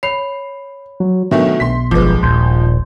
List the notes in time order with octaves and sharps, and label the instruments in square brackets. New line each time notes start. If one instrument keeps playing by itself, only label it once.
[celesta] C#5 B5 F7 [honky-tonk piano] C7
[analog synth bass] F#3
[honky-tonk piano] B2 D#3 A3 [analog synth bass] F#3 [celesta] D4 B4 E5
[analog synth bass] B1 [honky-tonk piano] C6 B6
[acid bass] G1 [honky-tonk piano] F3 G#3 [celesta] B4 D6
[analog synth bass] D#1 [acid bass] A#1 [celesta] C6 G6 G#6